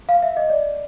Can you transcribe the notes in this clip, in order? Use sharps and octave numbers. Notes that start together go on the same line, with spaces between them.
F5
E5
D#5
D5